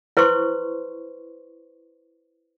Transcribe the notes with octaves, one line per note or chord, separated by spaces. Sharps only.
E4 B4 C5 C6 C#6